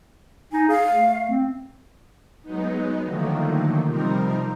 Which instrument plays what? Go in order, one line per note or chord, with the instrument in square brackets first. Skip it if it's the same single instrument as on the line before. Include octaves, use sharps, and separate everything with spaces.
[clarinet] D#4 [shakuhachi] G#5
[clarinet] G#4 [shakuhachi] F5
[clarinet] A3
C4
[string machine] F#3 G#3 B3 D#4
D3 D#3 F3 F#3 A3 A#3
C3 F3 G3 C4 D#4 A#4